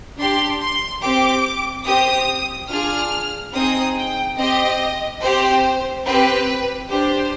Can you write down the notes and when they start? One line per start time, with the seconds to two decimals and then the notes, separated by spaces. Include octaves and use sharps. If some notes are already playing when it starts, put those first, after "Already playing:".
0.18 D4 G4 C6
0.60 C6
1.01 C4 G4 D6
1.86 C4 G4 D#6
2.70 D4 F4 G#4 F6
3.53 C4 D#4 G#4 D#6
3.96 G5
4.37 C4 G4 D#5
5.21 C4 G4 C5
6.05 C4 G4 B4
6.90 D4 G4 C5